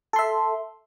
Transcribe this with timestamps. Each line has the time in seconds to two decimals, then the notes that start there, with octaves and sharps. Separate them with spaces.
0.13 A4
0.16 C6
0.19 E5